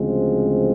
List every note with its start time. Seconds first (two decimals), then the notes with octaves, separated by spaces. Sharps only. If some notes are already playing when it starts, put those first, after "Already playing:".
Already playing: D2 C#3 F3 G#3 C4